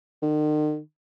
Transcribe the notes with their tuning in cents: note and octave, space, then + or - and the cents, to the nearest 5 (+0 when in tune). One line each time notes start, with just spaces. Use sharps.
D#3 -45